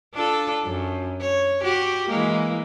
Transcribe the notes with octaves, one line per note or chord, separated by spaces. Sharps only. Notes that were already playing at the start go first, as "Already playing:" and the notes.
D4 F4 A4
F#2
C#5
F#4 G4
E3 G#3 A#3